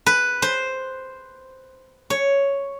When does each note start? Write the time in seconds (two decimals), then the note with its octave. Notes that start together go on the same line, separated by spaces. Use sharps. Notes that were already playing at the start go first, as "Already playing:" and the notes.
0.06 B4
0.42 C5
2.10 C#5